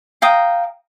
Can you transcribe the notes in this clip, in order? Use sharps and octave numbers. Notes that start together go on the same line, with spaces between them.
F5 G5 A#5 D#6